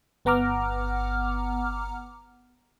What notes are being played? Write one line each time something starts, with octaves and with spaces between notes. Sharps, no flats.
G1 B3 F#5 A#5 D6 F6